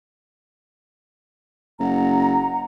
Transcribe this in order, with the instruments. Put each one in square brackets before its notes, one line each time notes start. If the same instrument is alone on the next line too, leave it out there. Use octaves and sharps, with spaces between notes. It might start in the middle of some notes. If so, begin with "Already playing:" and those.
[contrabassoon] F#1 [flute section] F#5 A#5